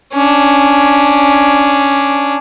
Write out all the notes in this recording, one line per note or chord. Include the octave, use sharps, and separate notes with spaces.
C#4 D4